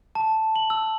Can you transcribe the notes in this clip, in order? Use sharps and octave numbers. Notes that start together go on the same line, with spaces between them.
A5
F#7
E6